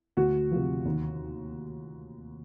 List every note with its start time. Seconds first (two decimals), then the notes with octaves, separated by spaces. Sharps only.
0.17 D2 F#4
0.51 C3 F3
0.85 D#2